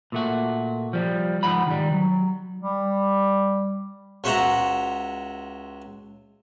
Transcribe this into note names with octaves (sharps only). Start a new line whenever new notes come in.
A#2 A3 F#4
F3 G3
G#2 F3 F#5 B5
D#3 G3
F#3
G3
C#2 F#4 C5 E5 F#5 A#5